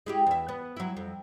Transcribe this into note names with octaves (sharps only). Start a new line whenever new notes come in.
G#3 E4 G4
E2 E5
B3
F#3 E4
F2